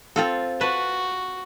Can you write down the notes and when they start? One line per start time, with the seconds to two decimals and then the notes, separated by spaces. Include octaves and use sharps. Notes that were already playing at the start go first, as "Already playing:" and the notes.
0.16 C4 F4 A4
0.61 F#4 B4 A5